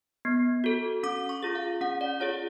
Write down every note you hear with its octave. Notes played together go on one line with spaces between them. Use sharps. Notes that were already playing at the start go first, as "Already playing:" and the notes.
B3
F#4 A4
C#4 D6
C#6
F4 G#4
F5
C#4 F#5
D5
F4 G#4 C#5